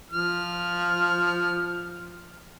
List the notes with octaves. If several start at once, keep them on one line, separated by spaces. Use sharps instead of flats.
F3 F6